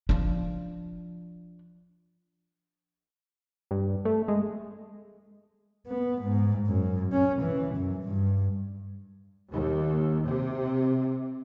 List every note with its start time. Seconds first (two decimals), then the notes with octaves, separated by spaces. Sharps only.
0.09 F3 D4
3.71 G2
4.05 A3
4.28 G#3
5.87 B3
6.22 G#2
6.67 F#2
7.12 C#4
7.42 E3
7.75 F#2
8.04 G2
9.51 D#2
10.25 C3